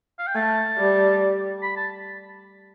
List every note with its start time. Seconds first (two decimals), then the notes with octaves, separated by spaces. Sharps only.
0.19 F5
0.27 G5
0.35 A3 A5
0.78 G3
1.62 B5
1.77 A5